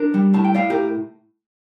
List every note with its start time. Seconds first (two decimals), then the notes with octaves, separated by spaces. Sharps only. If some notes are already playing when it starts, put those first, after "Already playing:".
Already playing: D4 A#4
0.14 G3
0.34 A2 A5
0.44 G5
0.54 A2 D5 F5
0.70 G4 A#4